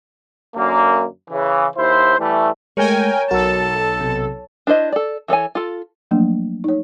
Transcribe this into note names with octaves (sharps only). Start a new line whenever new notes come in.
F#2 D3 A#3
C#3 E3
D#2 E4 C5
E3 G3 A3
G#3 A3 A#4 C#5 G5 G#5
B1 F#4 A4 A#4 A5
C3
D4 E4 C5 D#5
A4 D5
E3 A4 C#5 G#5
F4 A4
F3 F#3 A3 A#3 D4
D#4 C#5